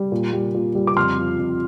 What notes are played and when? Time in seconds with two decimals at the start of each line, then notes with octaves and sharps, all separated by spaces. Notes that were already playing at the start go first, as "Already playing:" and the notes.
Already playing: G3
0.12 A#2
0.33 G3
0.54 A#2
0.75 G3
0.87 D6
0.97 F2 C6 F6
1.18 F3
1.39 F2